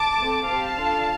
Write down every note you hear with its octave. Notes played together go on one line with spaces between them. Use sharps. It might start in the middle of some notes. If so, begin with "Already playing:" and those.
Already playing: A5 D6
A3 C4 A4
C4 G4 F5 A5
D4 F4 A4